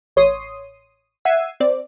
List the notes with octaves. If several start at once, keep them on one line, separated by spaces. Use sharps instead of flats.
A1 C#5 C6 D#6 C7
E5 F#5 E6 G#6 C7 D#7
C4 D5